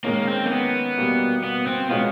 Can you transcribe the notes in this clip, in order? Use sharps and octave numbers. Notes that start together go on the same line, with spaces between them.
D#3 G#3 A#3 C#4
C4
A#3
B3
B2 G3 A#3
B3
C4
B2 G#3 B3 C#4 F4